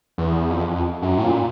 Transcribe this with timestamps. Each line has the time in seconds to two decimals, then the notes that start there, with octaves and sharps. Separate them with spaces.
0.18 E2
0.50 F2
1.02 F#2
1.18 A2
1.23 A#2